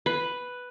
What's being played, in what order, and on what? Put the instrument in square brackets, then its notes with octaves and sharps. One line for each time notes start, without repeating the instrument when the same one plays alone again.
[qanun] B4